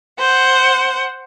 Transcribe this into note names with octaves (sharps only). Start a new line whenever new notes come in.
C5 F#5